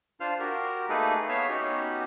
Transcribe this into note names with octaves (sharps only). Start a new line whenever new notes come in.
D4 F4 C5 F5 F6
F#4 G4 A#4
A3 A#3 D#4 G#4 A4 B4
B3 C#5 E5 F5
B3 C#4 D#4 F#4 G4